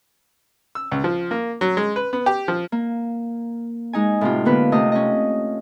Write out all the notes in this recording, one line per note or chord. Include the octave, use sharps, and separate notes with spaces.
E6
C#2
F3
A#3
F#3
G#3
B4
B3
G4
F3
A#3
G#3 D#4 G#5
A2 C3 F4
D3 A#3 B3 B4
C3 A3 D#5 C6 D#6
C#4 D#5